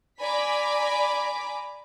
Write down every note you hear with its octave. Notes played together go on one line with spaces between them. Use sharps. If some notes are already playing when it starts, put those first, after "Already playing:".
D5 G#5 A#5 B5 D6 B6